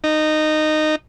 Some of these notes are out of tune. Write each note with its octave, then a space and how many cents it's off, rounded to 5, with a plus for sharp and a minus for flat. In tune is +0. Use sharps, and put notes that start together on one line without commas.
D#4 -15